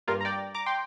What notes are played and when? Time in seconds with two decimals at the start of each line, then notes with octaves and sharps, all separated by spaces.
0.07 G2 G3 A#3 F4 A#4
0.21 A#5
0.25 D5 G5
0.54 A#5 D6
0.66 G5 C6